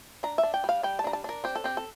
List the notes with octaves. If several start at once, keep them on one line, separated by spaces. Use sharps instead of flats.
D4 A#5
E5
D4
G5
G3 F5
G3 G5
A5
D4 A#5
A5
D4 A#4
C4 G4
A4
C4 G4
A4